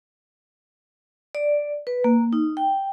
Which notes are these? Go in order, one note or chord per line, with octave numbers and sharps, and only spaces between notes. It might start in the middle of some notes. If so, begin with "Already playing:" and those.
D5
B4
A#3
D#4
G5